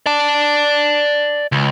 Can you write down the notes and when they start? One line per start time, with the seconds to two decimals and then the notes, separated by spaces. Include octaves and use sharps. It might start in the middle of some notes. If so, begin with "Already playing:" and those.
0.06 D5 A5
1.52 C#2